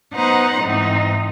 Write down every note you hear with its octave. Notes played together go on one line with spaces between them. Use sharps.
B3 D#4 B4 C5 F#5 A#5
G#2 E3 C4 D#4